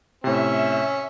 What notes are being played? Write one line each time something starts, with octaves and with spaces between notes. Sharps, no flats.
A2 C3 C#4 E5